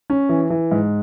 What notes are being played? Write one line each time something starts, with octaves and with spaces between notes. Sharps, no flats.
C#4
E3
E3
G#2